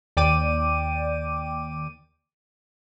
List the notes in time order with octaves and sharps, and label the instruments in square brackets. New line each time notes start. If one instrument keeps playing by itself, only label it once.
[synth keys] D#2 D5 G5 D6 D#7